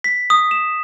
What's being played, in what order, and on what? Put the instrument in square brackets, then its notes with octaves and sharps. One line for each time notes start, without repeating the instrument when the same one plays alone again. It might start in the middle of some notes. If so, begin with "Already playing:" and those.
[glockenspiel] B6
D#6
E7